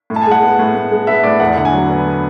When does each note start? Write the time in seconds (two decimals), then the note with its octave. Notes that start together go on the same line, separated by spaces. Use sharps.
0.10 A2
0.16 A5
0.21 G#5
0.26 G#3 F#5
0.43 B3
0.59 A2
0.75 A2
0.91 G#3
1.07 B3 E5
1.24 A2 D5
1.40 E2 F#5
1.57 D3 F#5
1.65 G#5
1.73 F#3
1.90 B3